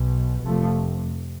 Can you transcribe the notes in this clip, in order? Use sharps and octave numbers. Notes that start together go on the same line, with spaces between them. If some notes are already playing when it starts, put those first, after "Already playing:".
Already playing: B1 B2
F1 F2 C3 F3 A3